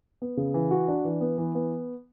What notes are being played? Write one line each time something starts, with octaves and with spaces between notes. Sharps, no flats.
B3
C#3
E3
F#4
D4
E3
B3
E3
B3